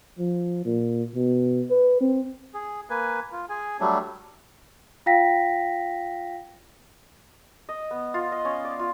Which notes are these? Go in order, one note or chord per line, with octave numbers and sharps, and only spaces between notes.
F3
A#2
B2
B4
C4
G#4
A#3 B4 G#5
F4
G#4 G#5
F#3 G3 A3 D4
F4 F5 G5 A#6 B6
D#5
B3
F4
D#5
C#4
D5
F4